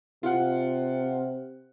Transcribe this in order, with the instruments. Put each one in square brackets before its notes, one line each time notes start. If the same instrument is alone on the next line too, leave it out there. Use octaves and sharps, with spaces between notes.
[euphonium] C3 [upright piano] F4 F#5